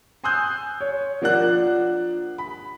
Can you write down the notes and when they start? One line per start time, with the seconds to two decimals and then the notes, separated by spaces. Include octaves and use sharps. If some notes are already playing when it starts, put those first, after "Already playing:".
0.24 G#5 C6 D#6 E6 F#6 G6
0.81 C#5
1.22 F3 A#3 D4 F#5 F#6
2.38 B5